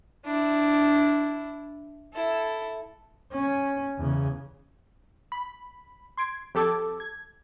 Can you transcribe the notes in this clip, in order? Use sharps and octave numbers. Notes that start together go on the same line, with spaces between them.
D4 E4
E4 A4
C#4
E2 C#3
B5
C6 G#6 D7
F2 G4 A4 D6 G#6
G#6